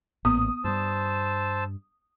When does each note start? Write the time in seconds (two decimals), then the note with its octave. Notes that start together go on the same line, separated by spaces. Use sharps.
0.25 A1 G#2 A#3 B3 D#6
0.64 G2 G3 C5 A5 E6